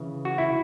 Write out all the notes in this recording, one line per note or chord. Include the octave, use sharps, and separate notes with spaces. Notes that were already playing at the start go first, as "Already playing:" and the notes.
Already playing: C#3 E3
F#4
E4